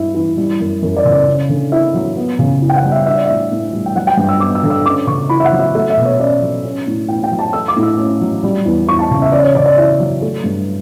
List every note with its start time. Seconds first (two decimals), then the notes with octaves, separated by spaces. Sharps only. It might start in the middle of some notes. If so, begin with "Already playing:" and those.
Already playing: G2 E4 E5
0.14 E3
0.37 G3
0.60 F#2
0.82 F#2
0.97 D5
1.05 C#3
1.12 D5
1.27 C#4
1.49 D3
1.72 E4 E5
1.94 F#3
2.17 B3
2.39 C#3
2.62 E4
2.69 G5
2.76 F#5
2.84 G3
2.92 E5
3.06 D4 E5
3.16 D5
3.26 A2 E5
3.51 A2
3.73 G3
3.86 G5
3.96 F#3 F#5
4.07 G5
4.17 G2 G5
4.29 E6
4.40 B3 D6
4.55 E6
4.63 D3
4.70 E6
4.85 C#4 D6
5.07 C#3 C#6
5.29 E4 B5
5.40 E5
5.45 F#5
5.52 F#3
5.59 E5
5.75 A3 E5
5.90 E5
5.97 B2
6.05 C#5
6.19 C#4 D5
6.42 F#3
6.65 C#4
6.87 A2
7.08 E4 G5
7.24 G5
7.32 F#3
7.39 A5
7.53 A3 E6
7.68 D6
7.76 A2
7.83 E6
7.98 C#4
8.21 F#3
8.43 G3
8.66 E2
8.87 E2 C#6
8.99 A5
9.11 C#3
9.22 E5
9.32 C#4 D5
9.43 C#5
9.55 C#3 D5
9.66 D5
9.77 E4 E5
10.00 F#3
10.22 A3
10.44 G2